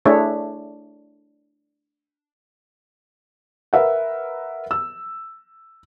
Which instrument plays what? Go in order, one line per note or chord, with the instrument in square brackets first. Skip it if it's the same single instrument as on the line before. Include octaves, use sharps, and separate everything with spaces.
[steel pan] A3 D4 E4 G#4 C#5 E5
[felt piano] A#4 B4 E5 F#5
E6